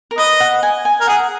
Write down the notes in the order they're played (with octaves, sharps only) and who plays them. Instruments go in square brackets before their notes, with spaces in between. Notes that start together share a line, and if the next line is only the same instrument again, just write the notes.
[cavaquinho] A#4
[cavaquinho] B4 [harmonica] D#5
[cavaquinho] F#5
G#5
G#5
[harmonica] A#4
[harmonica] G#4 [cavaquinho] F#5